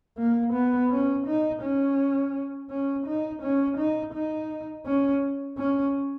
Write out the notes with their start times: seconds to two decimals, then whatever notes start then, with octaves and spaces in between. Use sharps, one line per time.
0.18 A#3
0.53 B3
0.90 C#4
1.26 D#4
1.62 C#4
2.70 C#4
3.06 D#4
3.42 C#4
3.77 D#4
4.13 D#4
4.86 C#4
5.58 C#4